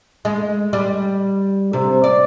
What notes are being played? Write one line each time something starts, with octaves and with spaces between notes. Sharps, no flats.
G#3
G3
C3
D5